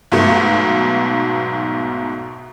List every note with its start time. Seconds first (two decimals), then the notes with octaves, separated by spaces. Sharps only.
0.12 B1 G#2 B2 A3